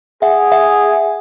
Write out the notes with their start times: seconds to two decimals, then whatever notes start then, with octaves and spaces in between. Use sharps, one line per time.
0.22 G#4 E5 F#5
0.52 E5 F#5